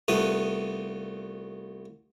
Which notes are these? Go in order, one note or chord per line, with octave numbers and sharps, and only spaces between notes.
C2 A3 B3 F4 D#6